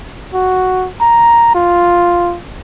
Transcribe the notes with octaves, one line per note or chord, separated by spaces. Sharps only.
F#4
A#5
F4